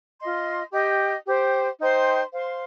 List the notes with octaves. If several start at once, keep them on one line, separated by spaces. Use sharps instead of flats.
F4 D#5 C6
G4 D#5 G5
G4 C5 G5
D#4 C5 G5 C6
C5 F5 C6